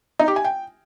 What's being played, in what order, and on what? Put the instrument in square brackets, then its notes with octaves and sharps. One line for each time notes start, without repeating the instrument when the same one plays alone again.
[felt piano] D#4
G4
G#5
G5